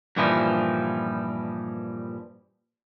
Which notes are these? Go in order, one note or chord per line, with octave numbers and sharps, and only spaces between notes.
G2 A#2 E3 F3 G3 D#4